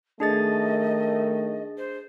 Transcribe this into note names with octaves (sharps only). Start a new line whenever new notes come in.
D#3 A3 D4 G#4 D#5 A6
C5